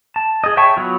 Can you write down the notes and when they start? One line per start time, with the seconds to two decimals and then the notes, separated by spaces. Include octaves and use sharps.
0.16 A5
0.44 G#4 D#5
0.57 C#5 E5 G5 A5 C#6
0.77 F#3 B3 F4